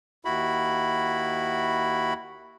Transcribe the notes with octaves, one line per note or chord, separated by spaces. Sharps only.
D#2 E4 F#4 B5